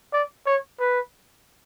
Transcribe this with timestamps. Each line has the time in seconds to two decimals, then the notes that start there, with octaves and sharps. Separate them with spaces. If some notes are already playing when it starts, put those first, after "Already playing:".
0.13 D5
0.46 C#5
0.80 B4